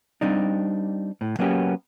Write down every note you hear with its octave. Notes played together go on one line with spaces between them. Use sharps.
G3 C4 D4 D#4
A2
F#3 A#3 B3 C#4 G4